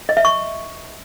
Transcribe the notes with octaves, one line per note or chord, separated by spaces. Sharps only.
D#5
E5
C#6